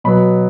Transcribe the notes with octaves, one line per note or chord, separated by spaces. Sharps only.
B2 F#3 B3 B5